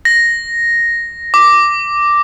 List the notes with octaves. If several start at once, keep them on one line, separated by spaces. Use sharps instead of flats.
A#6
D6